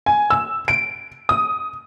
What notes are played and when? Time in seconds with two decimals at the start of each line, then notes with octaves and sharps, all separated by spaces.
0.06 G#5
0.30 E6
0.68 D7
1.29 D#6